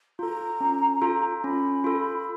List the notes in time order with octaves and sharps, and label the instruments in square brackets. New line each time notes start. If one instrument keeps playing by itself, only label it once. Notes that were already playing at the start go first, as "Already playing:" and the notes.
[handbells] F4 A4 [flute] A#5
[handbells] C#4
F4 A4
[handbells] C#4 [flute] B5
[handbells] F4 A4
[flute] B5